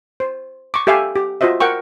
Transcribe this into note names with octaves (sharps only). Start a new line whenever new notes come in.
C5
C#6 D6
G4 A4 E5 F5 G5 G#5
G4
F4 F#4 C5 D#5 E5
A#4 F#5 G5 C#6